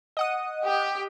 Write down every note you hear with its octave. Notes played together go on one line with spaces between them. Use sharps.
D#5 F#5 D#6
G4